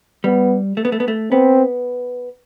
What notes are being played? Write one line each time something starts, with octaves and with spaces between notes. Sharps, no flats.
G3 B3
A3
B3
A3
B3
A3
B3 C4